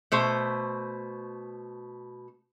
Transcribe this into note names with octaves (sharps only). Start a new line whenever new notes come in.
B2 A3 C5